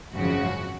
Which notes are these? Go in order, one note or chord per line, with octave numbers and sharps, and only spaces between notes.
G#1 F#2 C#3 F3 F#4